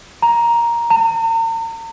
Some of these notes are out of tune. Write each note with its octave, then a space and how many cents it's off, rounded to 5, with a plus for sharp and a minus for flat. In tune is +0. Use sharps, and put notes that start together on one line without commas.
A#5 +5
A#5 -40